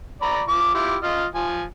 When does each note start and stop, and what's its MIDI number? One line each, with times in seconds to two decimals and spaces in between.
0.22 0.41 74
0.22 0.41 82
0.22 0.41 83
0.48 0.72 53
0.48 0.72 86
0.75 0.95 64
0.75 0.95 65
0.75 0.95 67
1.03 1.25 65
1.03 1.25 75
1.03 1.25 89
1.35 1.63 53
1.35 1.63 80